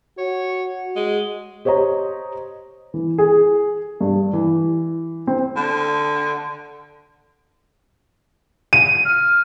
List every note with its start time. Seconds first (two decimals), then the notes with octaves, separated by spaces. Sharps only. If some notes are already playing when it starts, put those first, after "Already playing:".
0.18 F#4 C#5
0.96 G#3
1.65 G4 C5 C#5 D#5 A#5
2.94 E3
3.18 G#4
4.01 G2
4.33 E3
5.27 C4
5.56 D3
8.73 D#7
9.05 F6